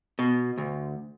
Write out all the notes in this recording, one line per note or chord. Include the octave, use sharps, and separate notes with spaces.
B2
D2